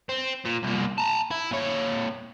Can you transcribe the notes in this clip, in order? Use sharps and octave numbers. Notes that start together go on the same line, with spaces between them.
C4
A#2
C2 A#2
A5 A#5
E4
A#2 C#5